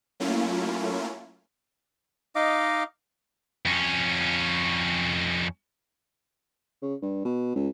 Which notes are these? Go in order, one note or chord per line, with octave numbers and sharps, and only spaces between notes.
F#3 A3 A#3 C#4 E4 F4
D#4 D#5 F5 D6
F2 C#4
C#3
G2
B2
C#2